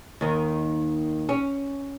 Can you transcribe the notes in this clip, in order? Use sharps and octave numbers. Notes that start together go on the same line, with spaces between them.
D#2 D#3
C#4